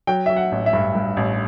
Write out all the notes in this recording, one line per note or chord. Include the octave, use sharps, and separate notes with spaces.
F#3 G5
F#3 E5
F#5
A1
E5
G2
G2
A1